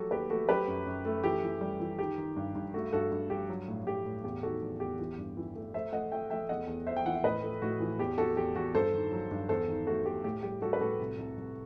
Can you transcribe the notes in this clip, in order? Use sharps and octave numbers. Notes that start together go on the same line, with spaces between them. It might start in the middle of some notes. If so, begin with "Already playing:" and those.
Already playing: F#3 A3 F#4 G4 A4
D#2 G4 B4
A3 F#4 A4
F#3 G4 B4
F#2
F#2
A3
E3 G4
E3
G3
E3
D#3 G4
D#3
G2
G2
A3 F#4
G2 F#4 A4
G2
G2 G4
F#3
A2
A2 G4
A2
E2 G4
D#3 F#4 A4
E2
E2 G4
E3 G4
G2
E3
A3
A3 C5 E5
A3 D#5 F#5
A3 E5 G5
A3 E5 G5
E2 D#5 F#5
E2
E2 C5 E5
G5
E3 F#5
E5
A2 B4 D#5
A3
A2 F#4
E3
E2 G4
E2 F#4 A4
E2 G4
E2 F#4
G2 A4 C5
D#3
F#3
G2
E2 A4 C5
D#3
A3 F#4 A4
A3 G4
A2 G4
G3 G4
G3 F#4 A4
B4
A2 F#4 A4
C2
C2
C2